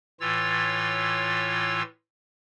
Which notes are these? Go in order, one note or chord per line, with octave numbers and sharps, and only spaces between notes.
A2 E3 F4 C#5 E6 A6